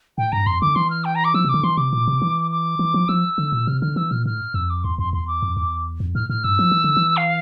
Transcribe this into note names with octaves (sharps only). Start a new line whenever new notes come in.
A2 G5
G2 A#5
F2 C6
D3 D6
E3 C6
F6
G5
A#5
D6
F3 E6
C3 D6
D3
E3 C6
C3 D6
A#2
C3
E3
D6
E3
F3
F3 E6
D3
A#2
C3 F6
D3 F6
E3 E6
A#2 F6
A2 F6
F2 E6
D6
E2 C6
F2 C6
E2 C6
D6
F2
E2
F2
A2 F6
A2 F6
G2 E6
F3
E3
D3
E3
F5